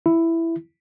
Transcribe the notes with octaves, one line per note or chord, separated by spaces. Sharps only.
E4